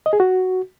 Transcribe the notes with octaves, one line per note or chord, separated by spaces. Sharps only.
D#5
G#4
F#4